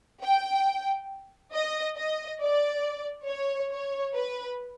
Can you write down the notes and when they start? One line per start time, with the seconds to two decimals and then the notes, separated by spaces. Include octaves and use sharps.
0.24 G5
1.54 D#5
1.97 D#5
2.41 D5
3.28 C#5
3.71 C#5
4.15 B4